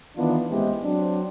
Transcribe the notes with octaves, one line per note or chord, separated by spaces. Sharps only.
D#3 E3 B3 D4 D#4 F4
A1 G#3 B3 C4 E4 G4
F#3 C4 D4